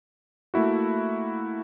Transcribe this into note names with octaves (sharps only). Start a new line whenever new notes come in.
A3 A#3 E4 F#4